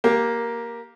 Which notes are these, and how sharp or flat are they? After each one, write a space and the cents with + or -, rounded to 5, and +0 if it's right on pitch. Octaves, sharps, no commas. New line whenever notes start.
A#3 +5 G4 +0